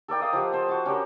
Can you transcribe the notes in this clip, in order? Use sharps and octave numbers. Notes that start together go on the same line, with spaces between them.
A4 A#4 D5 G5
D#5 F5 D#6
F3 G4 F#5
A4 C5
F#4 A5
C#4 D4 G4 A#4